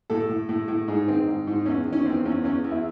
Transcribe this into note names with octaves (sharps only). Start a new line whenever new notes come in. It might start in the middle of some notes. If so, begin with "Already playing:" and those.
A2 A4
A2
A2
A2
G#2 G#4
D#3 C4
G#2
G#2
E2 C#4
D#3
C#4
E2 C4
E2 C#4
E2 C#4
E2
E4